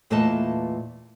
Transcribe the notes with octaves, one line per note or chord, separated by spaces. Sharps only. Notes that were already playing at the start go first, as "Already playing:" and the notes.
E2 A#2 A3 B4 D#5 A5